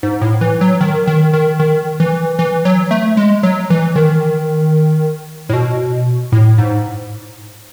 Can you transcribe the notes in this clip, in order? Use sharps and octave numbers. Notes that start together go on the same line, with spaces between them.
G#2
A2
E3
F#3
D#3
D#3
D#3
D#3
E3
E3
F#3
A3
G#3
F#3
E3
D#3
A2
B2
A2
G#2